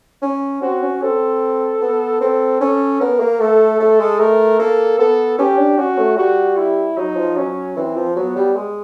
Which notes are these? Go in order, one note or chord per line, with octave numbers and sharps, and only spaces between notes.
C#4
C4 F#4
C#4
C4 A4
B3
C4 A4
C#4 A4
B3 A#4
A#3
A3 A4
A3
G#3
A3 A#4
A#3 A4
B3 A4
C#4 G4
D4
C#4 F#4
A3
G3 F#4
E4
F#3 D#4
F3
F#3 C#4
E3 C4
F3
F#3 B3
G3
G#3